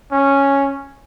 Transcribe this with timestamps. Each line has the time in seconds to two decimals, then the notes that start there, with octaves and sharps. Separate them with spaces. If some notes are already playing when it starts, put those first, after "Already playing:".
0.12 C#4